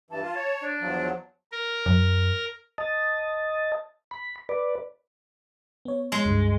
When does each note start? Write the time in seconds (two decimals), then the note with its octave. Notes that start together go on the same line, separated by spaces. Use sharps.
0.11 G2 E3 A5
0.22 F4
0.35 C#5
0.61 D4
0.81 E2 F3 F#3
1.52 A#4
1.86 F#2
2.78 D#5 A5
4.11 B5
4.49 B4 D5
5.85 B3 C#5
6.12 G#3
6.25 C#2 G2